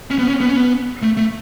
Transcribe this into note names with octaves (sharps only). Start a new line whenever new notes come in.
C#4
B3
C#4
B3
C#4
B3
A3
A3